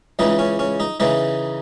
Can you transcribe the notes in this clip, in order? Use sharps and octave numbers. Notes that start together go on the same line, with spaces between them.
C#2 C#3 E3 D#4
C#4
C#4
D#4
C#3 E3 D#4